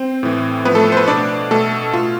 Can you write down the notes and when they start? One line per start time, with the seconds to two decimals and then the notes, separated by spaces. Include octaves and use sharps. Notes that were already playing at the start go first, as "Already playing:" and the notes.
Already playing: C4 C5
0.23 A2 E3
0.65 A2 F3 B3 B4
0.75 A3 A4
0.92 C5
0.97 B3 B4
1.08 B2 D4 D5
1.51 B2 A3 A4
1.93 B2 F4